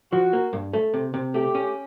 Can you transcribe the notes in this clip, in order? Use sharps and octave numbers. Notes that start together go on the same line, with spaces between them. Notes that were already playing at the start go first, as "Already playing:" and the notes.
F3 F#4
A#3
G2
A3
C3
C3
A3 G4
C#4